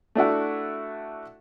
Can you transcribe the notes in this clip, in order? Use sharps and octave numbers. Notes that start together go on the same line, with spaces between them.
A3 D4 E4 F#4